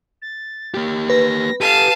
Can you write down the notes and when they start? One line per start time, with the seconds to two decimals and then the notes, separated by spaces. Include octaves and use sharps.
0.22 A6
0.74 A#3 G4
1.10 B4 A#6
1.61 G4 A4 F5 A5 D#7